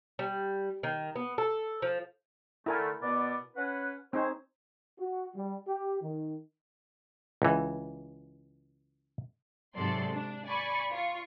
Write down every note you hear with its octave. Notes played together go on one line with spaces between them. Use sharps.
G3
D#3
B3
A4
F3
D3 A3 E4 A#4 G#5
B2 B3 D5
C#4 B4 F#5
C4 D#4 G#4 C5 C#5
F#4
G3
G4
D#3
C#2 E3
G#2 C3 F#3 A4 D5 C6
D4
D5 G#5 B5 C#6
F4 C#6